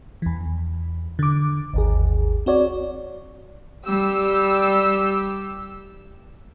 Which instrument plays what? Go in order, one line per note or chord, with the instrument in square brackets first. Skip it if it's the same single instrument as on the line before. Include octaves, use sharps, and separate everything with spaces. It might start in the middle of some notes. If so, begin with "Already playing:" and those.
[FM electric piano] E2 E3
D3 D6
G#1 D#2 G#4
C4 F#4 C#5 D5
[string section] G3 G4 E6